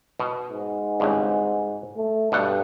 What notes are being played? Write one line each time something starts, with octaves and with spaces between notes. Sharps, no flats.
B2
G#2
G#1 C#2 G2
A3
G2 B2 G3 F#5